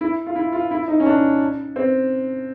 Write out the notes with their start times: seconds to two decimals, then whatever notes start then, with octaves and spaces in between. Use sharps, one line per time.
0.01 E4
0.27 F4
0.36 E4
0.52 F4
0.71 E4
0.88 D#4
1.00 C#4
1.06 D4
1.76 C4